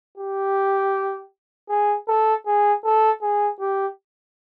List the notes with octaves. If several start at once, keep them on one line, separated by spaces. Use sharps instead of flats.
G4
G#4
A4
G#4
A4
G#4
G4